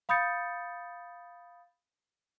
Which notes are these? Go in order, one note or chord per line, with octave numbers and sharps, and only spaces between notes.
F5 B5 D#6 G6 A6 C#7